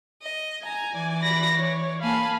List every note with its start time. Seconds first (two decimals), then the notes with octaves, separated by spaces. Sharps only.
0.20 D#5
0.64 G#5 A#5
0.94 E3 D5
1.23 B5 A#6
1.58 C#5
2.02 A#3 F5 G#5 A5 B5